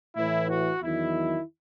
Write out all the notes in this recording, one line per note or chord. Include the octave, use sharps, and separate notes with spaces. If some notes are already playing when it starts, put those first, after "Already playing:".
A2 E3 E4
F#4
E2 D#3 F#3 E4